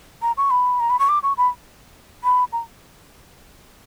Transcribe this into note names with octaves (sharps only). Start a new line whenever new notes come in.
A#5
C#6
B5
A#5
B5
C#6
D6
C#6
B5
B5
A#5